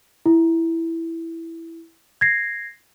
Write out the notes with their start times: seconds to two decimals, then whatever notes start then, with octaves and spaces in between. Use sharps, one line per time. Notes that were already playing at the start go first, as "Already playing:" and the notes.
0.26 E4
2.21 G#6 A#6 C7